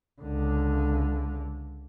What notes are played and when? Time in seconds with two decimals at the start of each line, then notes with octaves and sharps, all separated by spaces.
0.22 C#2 D3